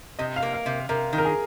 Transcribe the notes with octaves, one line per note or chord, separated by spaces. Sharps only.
C3 D#5
F5
A#3
F5
C3
C3 A#4
D#3
A#4
G#4